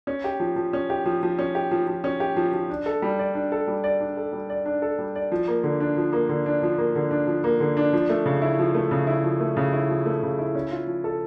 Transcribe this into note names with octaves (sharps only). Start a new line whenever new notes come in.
C#4
G4
F3
F3
C#4
G4
F3
F3
C#4
G4
F3
F3
C#4
G4
F3
F3
D4
A4
G3
D5
D4
A4
G3
D5
D4
A4
G3
D5
D4
A4
G3
D5
F3
A#3
D3
D4
F3
A#3
D3
D4
F3
A#3
D3
D4
F3
A#3
D3
D4
F3
A3
C#3
E4
F3
A3
C#3
E4
F3
A3
C#3
E4
F3
A3
C#3
E4
C#4
F4
F3
A4